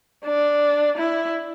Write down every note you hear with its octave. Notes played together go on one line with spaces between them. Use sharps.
D4
E4